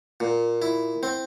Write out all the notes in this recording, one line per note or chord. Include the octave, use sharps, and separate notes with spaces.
A#2
E4
C4